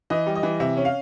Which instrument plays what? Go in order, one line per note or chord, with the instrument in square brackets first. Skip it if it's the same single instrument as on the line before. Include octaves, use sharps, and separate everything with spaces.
[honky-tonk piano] E3 D#5
G3
D#5
E3
C3 E5
C#4
F5